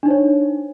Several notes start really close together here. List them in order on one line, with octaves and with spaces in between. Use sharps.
D4 D#4 C5 C#5